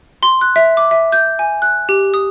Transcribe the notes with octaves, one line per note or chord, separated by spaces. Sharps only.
C6
F#6
E5
D6
E5
G6
G#5
F#6
G4
D#6